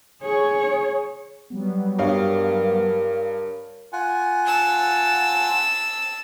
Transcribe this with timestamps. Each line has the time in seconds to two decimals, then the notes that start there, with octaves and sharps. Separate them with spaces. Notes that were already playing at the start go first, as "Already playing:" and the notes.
0.22 G#4 C#5
1.50 F#3 G3 B3
1.99 G2 G4 A#4 C#5 F5 D#6
3.93 F4 F#5 G#5
4.46 A5 E6